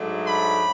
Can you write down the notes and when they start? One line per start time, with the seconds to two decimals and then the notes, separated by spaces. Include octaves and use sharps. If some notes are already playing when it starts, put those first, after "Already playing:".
Already playing: G#2 F#3 A3 D4
0.26 B5